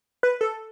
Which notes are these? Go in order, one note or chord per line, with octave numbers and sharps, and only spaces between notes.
B4
A4